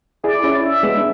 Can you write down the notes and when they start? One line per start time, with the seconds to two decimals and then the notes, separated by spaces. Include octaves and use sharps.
0.24 E4 G#4 D5
0.44 C#4 E4
0.64 E5
0.83 G#3 B3
0.97 D4